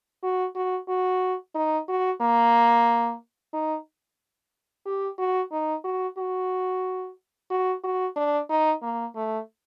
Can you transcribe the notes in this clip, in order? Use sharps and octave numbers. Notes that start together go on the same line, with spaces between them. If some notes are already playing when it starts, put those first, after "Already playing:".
F#4
F#4
F#4
D#4
F#4
A#3
D#4
G4
F#4
D#4
F#4
F#4
F#4
F#4
D4
D#4
A#3
A3